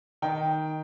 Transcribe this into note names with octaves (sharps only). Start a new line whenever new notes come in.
D#3 G5